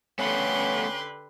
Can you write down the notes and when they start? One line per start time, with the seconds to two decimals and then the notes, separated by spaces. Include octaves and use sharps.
0.19 D3 A3 B3 C#4 G4 B4 C6